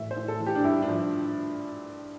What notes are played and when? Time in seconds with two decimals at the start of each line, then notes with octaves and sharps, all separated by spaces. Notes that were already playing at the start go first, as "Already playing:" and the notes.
Already playing: A2 E3 E5
0.11 C5
0.16 A2
0.28 A4
0.40 E3
0.46 G4
0.55 D4
0.64 G2 E4
0.82 D4
0.88 F3